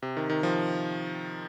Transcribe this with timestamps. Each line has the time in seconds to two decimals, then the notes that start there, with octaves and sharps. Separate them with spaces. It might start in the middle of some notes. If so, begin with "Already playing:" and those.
0.02 C3
0.17 D#3
0.30 D#3
0.43 F3